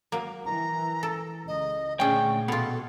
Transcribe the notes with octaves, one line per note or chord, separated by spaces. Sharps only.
F#3 A#3
E3 A#5
A4
C#2 D#5
D2 A#2 C#4 G#4 D5 G5 C#6
B2 B3 F4 A4